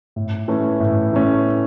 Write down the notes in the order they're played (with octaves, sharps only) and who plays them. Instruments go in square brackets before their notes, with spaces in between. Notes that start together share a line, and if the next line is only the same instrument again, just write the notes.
[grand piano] A2
E3 A3 C#4
A2
E3 A3 C#4